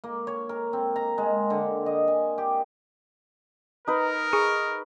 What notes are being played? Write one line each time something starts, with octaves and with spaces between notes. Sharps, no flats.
A#3
C#5
A#4
C4
A#5
G#3
D3
D#5
G#5
G4
D#4 A#4 B4
G#4 C#6 D#6